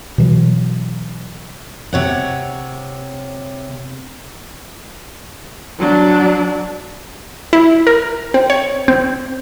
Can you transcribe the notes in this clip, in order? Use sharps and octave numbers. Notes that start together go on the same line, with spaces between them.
B2 E3 F#3
C3 C#5 F#5
F#3 D4
E4
A#4
C4
C#5
C4